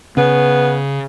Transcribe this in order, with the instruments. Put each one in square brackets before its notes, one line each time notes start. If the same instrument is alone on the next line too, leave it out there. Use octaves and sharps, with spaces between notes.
[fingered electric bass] C#3 [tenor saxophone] B3